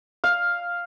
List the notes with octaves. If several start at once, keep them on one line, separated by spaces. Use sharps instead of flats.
F5